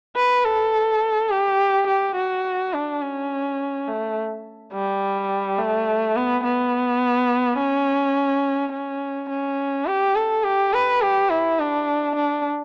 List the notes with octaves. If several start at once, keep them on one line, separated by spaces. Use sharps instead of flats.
B4
A4
G4
G4
F#4
D4
C#4
A3
G3
A3
B3
B3
C#4
C#4
C#4
G4
A4
G4
B4
G4
E4
D4
D4